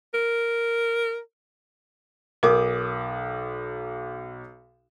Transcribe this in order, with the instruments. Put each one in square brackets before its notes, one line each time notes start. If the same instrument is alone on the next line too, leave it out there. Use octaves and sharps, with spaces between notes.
[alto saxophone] A#4
[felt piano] B1 D6 D#6 [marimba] A#4